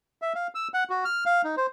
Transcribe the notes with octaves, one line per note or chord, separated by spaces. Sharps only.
E5
F5
E6
F#5
F#4
F6
F5
D#4
C5